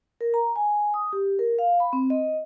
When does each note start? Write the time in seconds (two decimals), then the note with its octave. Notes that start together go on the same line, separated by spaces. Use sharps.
0.21 A#4
0.34 A#5
0.56 G#5
0.94 D#6
1.13 G4
1.39 A#4
1.59 F5
1.80 B5
1.93 C4
2.10 D#5